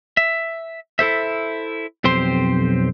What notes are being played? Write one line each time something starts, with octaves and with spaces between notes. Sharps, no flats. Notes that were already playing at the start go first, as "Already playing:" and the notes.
E5
E4 A4 C5 E5
B1 F2 C4 G4 C5 C6